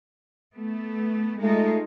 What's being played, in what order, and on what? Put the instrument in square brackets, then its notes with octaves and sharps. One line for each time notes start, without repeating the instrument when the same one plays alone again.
[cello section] A3 B3
[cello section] G#3 D#4 F4 [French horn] A3